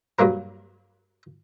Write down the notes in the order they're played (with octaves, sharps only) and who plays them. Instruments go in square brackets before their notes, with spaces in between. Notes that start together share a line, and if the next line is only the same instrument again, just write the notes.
[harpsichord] G2 F#3 A#3 A#4